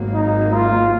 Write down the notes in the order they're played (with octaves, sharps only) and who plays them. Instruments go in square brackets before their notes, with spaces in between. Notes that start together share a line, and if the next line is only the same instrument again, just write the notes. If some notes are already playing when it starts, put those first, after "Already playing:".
Already playing: [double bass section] G#1 G#2 F#3 A#3
[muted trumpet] D#4
F4